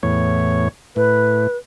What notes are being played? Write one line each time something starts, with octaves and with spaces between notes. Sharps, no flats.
E2 A2 C#5
A2 B4